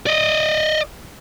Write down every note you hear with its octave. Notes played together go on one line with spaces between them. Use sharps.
D5 D#5